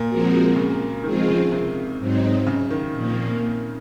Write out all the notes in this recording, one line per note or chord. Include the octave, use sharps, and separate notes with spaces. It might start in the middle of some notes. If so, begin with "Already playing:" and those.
Already playing: A#2
F3 G#3 C4 F#4 A#4
C#3
D#3 F3 G#3 C4 F4 G#4
C#3
C3
G#2 F#3 C4 D#4
C#3
D#3
A#2 F3 A#3